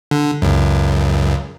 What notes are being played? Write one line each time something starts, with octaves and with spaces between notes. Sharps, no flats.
D3
C#2 F#2